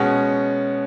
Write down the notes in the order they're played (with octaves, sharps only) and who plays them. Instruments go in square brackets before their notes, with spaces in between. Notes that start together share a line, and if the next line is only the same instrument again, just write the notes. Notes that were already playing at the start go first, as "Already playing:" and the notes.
Already playing: [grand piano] B2 G#3 C#4 F#5